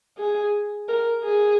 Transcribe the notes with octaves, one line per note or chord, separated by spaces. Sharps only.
G#4
A#4
G#4